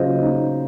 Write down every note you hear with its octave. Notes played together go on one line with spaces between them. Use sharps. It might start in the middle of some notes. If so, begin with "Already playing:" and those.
Already playing: C#3 F#3 F4 C5 D#5
D#4